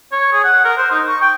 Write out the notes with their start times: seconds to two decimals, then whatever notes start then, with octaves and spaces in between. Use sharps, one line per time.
0.12 C#5
0.33 G#4
0.44 F#5
0.65 A#4
0.78 C5
0.91 D#4
1.08 C#6
1.21 G5